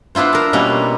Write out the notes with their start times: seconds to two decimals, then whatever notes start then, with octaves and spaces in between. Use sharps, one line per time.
0.15 B3 D4 E4 F4 C5
0.33 A#4 A5
0.53 B2 G3 A#3 B3 C#4